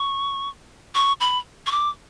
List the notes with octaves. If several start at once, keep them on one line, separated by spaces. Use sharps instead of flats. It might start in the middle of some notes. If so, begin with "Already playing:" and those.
Already playing: C#6
C#6
B5
C#6
D6